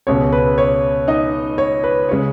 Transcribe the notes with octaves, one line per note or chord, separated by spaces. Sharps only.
C#2 B2 G#3 C#5
B4
C#5
D#4 D#5
C#5
B4
C#3 G#3 C#5